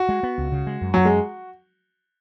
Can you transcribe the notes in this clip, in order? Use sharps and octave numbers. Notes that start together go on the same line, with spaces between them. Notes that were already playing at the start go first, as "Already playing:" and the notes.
Already playing: F#4
G#3
B3
C#2
C#3
G#3
F#2
F#2 F#3
G#3